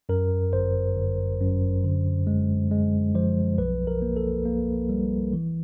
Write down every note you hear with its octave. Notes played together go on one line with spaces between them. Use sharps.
F#2 A#4
G1 C5
G1
F#2
D3
G#3
G#3
F3 C5
B1 B4
A#4
A#3
A4
A#3
G3
E3